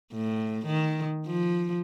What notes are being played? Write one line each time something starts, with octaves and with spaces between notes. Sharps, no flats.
A2
D#3
F3